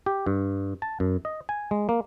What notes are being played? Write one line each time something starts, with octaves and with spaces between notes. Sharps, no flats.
G4
G2
A5
F#2
D#5
G#5
G#3
A#3